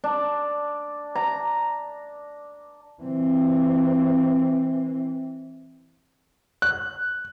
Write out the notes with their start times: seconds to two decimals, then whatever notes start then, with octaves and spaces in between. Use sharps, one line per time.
0.04 D4
1.15 A#5
3.03 E3 C4
6.62 F#6